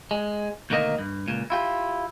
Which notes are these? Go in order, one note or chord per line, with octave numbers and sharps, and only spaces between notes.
G#3
D2 B2 D#3 A#3 D#5
G2
C#2 A#2
E4 F4 G4